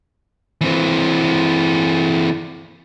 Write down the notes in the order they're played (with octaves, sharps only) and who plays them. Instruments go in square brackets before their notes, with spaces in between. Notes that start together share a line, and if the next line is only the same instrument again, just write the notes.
[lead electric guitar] E3 C4